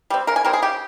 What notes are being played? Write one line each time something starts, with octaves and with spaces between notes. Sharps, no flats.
G3 C4
C#3 A#4
G#5
G3 C4 A#4
G#4
C#3 G4